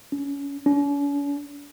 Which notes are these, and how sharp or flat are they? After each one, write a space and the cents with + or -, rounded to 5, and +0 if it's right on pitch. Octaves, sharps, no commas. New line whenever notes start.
C#4 +25
C#4 +45